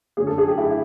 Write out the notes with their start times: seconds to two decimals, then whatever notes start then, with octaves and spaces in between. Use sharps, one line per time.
0.17 F#2 D3 G#4
0.27 A4
0.38 G#4
0.48 G4
0.58 E4